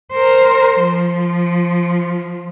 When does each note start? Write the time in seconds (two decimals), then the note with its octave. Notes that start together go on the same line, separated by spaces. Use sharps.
0.12 A#4 C5
0.81 F3